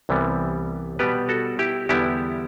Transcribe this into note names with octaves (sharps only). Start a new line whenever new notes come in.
C2 C3 E3 G3 B3
B2 G3 B3 G4 B4
F#4 A4
E4 G4
E2 D3 G3 B3 E4 G4